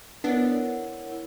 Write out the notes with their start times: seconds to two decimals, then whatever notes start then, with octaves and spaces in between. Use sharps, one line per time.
0.24 B3 D4 E4 A#4 C#5 F#5
1.11 E4